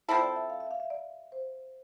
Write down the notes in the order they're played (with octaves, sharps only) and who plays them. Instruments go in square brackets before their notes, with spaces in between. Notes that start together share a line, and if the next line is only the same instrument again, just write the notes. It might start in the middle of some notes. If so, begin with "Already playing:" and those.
[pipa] F3 C4 E4 A4 [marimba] E5
[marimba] D5
E5
F5
E5
F5
E5
D5
C5